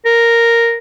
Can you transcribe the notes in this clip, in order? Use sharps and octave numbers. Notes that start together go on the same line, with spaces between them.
A#4